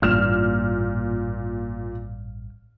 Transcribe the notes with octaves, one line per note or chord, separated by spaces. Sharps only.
A1 G2 A#2 F6 E7